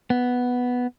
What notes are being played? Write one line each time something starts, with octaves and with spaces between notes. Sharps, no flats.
B3